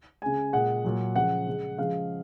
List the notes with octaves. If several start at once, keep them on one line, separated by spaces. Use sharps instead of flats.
C#3 G#3 G#5
A#2 G#3 F#5
A#2 F#3
C#3 F3 G#3 F#5
C#3 G#3
C#3 F3 G#3 F5